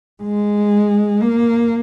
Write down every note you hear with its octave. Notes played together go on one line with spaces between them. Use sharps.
G#3
A#3